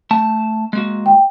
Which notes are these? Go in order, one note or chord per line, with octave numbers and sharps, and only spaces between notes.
A3 A5
G#3 A#3 F#4
G5